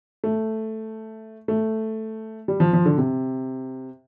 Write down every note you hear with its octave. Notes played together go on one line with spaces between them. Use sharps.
A3
A3
G3
F3
F3
D3
C3